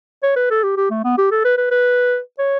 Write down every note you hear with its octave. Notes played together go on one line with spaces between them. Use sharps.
C#5
B4
A4
G4
G4
A3
B3
G4
A4
B4
B4
B4
C#5